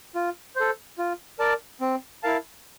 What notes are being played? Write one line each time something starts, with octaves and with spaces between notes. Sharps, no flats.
F4
A4 C5
F4
A#4 D5 A5
C4
E4 A#4 F5 A5